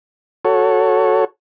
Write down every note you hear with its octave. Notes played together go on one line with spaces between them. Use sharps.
F#4 A4 C#5